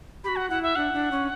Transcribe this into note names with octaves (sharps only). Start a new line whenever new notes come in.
F#4 G4 B5
F#5
E4 F#5
E5
D4 F#5
D4
C#4